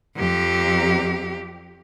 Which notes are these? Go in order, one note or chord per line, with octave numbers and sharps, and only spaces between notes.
F2 G4